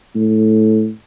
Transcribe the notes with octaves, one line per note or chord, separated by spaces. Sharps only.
A2